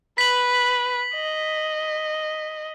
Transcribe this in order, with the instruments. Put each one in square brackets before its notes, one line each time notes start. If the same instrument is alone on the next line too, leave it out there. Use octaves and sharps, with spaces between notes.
[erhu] B4 [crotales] B6 F#7
[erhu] D#5